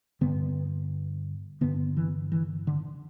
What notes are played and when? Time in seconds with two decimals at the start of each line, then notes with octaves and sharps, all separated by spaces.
0.21 G2 D3 B3
1.61 G2 D3 B3
1.97 E3
2.32 E3
2.67 D3